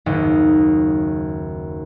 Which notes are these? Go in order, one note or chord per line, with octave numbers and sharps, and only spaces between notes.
F#1 D#2 G#2 C#3